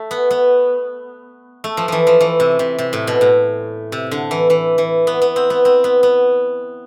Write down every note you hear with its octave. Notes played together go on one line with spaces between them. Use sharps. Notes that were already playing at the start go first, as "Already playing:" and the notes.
Already playing: A3
B3
B3
A3
F3
E3 F3
F3
E3
C3
C3
C3
A2
B2
A2
C3
D3
E3
E3
E3
B3
B3
C4
B3
C4
B3
B3